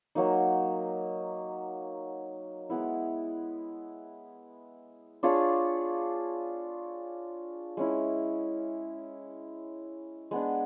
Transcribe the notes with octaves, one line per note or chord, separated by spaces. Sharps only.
F#3 A#3 D#4
G#3 B3 E4
D4 F4 G#4 C#5
G#3 C#4 E4
G#3 B3 D4